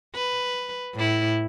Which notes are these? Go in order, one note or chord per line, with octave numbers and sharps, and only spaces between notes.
B4
A2 E4